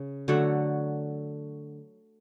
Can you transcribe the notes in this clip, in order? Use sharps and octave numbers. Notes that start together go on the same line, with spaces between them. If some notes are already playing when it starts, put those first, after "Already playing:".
Already playing: C#3
D3 F#3 A3 F#4